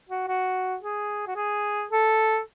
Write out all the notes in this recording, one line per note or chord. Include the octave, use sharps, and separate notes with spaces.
F#4
F#4
G#4
F#4
G#4
A4